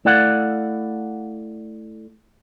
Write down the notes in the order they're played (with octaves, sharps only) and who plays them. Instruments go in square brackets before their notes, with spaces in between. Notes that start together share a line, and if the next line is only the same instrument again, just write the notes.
[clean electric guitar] A3 E4 A4 D5 F5 F#5